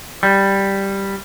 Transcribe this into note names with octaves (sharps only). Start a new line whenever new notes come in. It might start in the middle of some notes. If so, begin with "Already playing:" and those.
G3